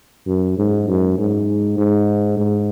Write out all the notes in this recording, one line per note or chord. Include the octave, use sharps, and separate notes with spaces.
F#2
G#2
F#2
G#2
G#2
G#2